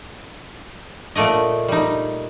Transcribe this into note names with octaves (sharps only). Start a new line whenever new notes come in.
A#2 A3 D5 D#5
G3 D#4